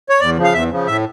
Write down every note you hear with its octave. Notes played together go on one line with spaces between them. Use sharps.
C#5
E2 D5
C#3 F3
F5
E2 E5
C#3 F3
A2 E5